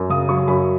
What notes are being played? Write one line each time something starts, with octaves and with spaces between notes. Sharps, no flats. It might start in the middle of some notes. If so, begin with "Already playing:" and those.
Already playing: F#2
C#3 D#6
F#3 C#6
F#2 B5